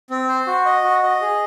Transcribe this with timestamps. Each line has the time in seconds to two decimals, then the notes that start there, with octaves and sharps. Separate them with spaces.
0.10 C4
0.28 C5
0.47 F#4
0.65 D#5
0.84 F#4
1.03 D#5
1.22 G#4